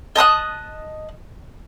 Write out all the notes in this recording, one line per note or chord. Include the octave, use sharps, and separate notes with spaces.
D#5 A5 D#6 F#6